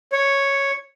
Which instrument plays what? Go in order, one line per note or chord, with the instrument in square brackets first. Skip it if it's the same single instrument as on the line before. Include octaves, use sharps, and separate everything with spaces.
[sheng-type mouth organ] C#5